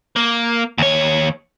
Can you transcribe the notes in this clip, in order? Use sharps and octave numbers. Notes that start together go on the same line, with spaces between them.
A#3
D#2 C#5